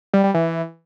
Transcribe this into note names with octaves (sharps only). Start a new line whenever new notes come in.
G3
G3
E3